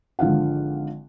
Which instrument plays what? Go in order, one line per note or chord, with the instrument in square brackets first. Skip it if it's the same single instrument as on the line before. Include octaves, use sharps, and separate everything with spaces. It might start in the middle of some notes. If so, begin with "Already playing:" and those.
[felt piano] G#1 D3 F3 F5 F#5